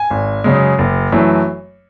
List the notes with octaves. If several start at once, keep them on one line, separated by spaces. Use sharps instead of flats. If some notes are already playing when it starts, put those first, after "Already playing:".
Already playing: G#5
G#1
F#2 C#3 G#3
F#1
F#2 E3 A3